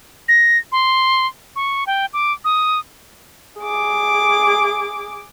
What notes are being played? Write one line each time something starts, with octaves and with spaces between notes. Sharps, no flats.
A#6
C6
C#6
G5
D6
D#6
G#4 D6